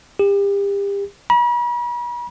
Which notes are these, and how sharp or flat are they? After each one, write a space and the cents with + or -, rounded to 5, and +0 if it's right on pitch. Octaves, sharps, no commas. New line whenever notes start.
G4 +35
B5 -45